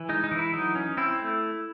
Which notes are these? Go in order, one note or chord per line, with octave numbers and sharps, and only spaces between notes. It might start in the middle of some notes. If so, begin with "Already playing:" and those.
Already playing: E3
G#3 D#4
D#4
E3
E4
F#3 D#4
C#4
C4 E4
A3